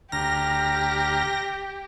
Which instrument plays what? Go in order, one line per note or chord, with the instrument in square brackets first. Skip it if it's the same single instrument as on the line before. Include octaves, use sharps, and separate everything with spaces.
[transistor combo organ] D2 A#5 F6 [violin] G4 [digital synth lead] A#6